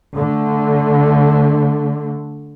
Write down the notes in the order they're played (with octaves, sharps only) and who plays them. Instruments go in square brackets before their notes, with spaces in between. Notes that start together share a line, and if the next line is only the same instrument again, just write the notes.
[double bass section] D3 A3